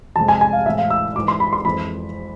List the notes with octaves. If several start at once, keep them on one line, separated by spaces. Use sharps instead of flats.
F2 C3 G#3 A5
G#5
G#5
F5
A2 E3 G#3 E5
F5
E6
G#2 E3 G#3 D6
C6
B5
C6
F2 E3 G#3 B5